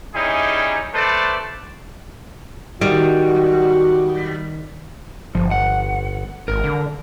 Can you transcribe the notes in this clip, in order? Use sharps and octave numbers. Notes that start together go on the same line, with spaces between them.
G3 C#4 D#4 E4 G4 G#4
A3 A4 B4 C5 D5 A5
D#3 G3 F#4
G1 F3
F#5
G#1 A#4
D3